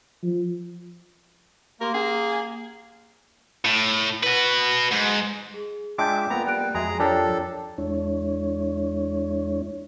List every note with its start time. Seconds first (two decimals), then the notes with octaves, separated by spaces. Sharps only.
0.24 F3
1.81 A#3 G4 A#4 C6 D6
1.94 C#4 G#4 A#5
3.65 A2
4.23 F#4 B4
4.91 G#2
5.54 G#4
5.98 G#3 D4 F4 E5 G5 A5 D6 G6
6.30 F2 A#3 B3 A#5
6.46 G3 G5 F#6 D7
6.74 F2 G#3 F#4 G#4 E5 A#5
7.00 D4 F4 G4 A4 A#4 C#5 G5
7.78 E2 G#3 D4 E4 C#5